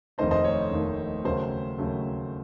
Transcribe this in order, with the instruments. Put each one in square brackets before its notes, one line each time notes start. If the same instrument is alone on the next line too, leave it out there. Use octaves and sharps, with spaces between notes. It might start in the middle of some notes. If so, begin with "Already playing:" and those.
[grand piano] F1 D#2 D#3 A3 D#4 [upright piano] C5 D#5
[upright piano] C5 D#5
C#5
[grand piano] F1 D#2 D#3 A3 D#4
[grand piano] D#2 C#3 F#3 A3 [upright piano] C5
[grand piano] D#2 C#3 F#3 A3